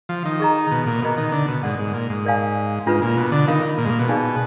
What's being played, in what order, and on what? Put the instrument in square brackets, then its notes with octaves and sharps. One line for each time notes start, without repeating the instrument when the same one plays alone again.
[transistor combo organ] F3
D#3
[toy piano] G#4 D#5 A#5
[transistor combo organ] B2
A#2
[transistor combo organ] B2 [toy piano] F#4 A#4 D#5 A#5
[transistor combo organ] D#3
D3
B2
[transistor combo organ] G#2 [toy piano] A#4 D5 F#5
[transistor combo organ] G#2
A#2
G#2
[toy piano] A#4 D5 F5 G#5
[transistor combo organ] G#2 [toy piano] D4 F4 B4
[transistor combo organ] A#2
B2
D3
[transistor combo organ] D#3 [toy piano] A#4 F5 B5
[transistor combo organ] A#2
G#2
A#2
B2
[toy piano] D#4 G#4 D5 F5 G#5